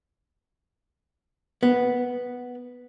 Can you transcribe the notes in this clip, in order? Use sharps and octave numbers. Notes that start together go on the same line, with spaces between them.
B3